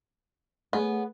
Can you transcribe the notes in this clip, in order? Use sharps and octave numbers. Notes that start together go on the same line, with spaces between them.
A3 B3 G#4 C#5 G#5